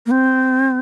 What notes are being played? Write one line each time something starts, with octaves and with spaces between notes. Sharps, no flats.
A#3
C4